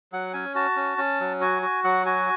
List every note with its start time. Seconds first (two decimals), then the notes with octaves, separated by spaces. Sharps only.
0.12 F#3 F#5
0.33 C#4 G#5
0.55 F#4 A5
0.76 C#4
0.98 C#4
1.20 F#3
1.41 F#4 G#5
1.62 F#4
1.84 F#3 F#5
2.06 F#4 G#5